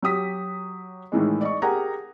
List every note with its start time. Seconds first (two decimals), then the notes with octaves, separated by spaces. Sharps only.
0.02 F#3 G4 D#6 B6
1.12 A2 D#3 E3 G#3
1.41 D5 D#5 C#6
1.62 G4 G#4 A#4 F#5 G#5 A#5